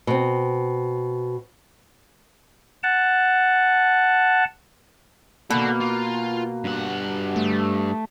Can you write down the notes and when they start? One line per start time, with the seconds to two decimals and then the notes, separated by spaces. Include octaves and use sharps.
0.07 B2 C4
2.83 F#5 A5
5.51 B2 A#3 A4 F#5
5.80 F4
6.64 G2 F#5
7.36 A3